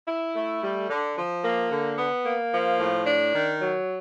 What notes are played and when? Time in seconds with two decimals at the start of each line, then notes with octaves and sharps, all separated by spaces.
0.08 E4
0.35 A3
0.62 G3
0.89 D3
1.16 F3
1.43 A#3
1.70 D3
1.97 B3
2.25 A#3
2.52 F3
2.79 A2
3.06 D4
3.33 D#3
3.61 F#3